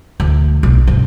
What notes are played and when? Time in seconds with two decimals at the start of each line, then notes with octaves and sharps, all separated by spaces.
0.20 D2
0.63 B1
0.87 G2